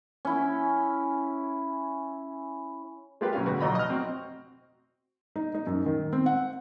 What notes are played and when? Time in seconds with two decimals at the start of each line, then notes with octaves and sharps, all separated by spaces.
0.25 C#4 E4
3.21 G#3 A#3 F4 G4 B4
3.33 B1 C#4 F5
3.46 D2 A2 F#4 B4
3.60 B1 F2 F#4 D#5 A#5 B5
3.75 D#5 F6
3.90 C4 F#4
5.36 D#4
5.55 D#4
5.67 F#2
5.86 D#3
6.13 C4
6.26 F#5